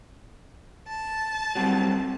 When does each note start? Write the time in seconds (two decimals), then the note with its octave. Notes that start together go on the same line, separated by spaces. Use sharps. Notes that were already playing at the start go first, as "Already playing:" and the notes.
0.88 A5
1.55 F#3 G3 C4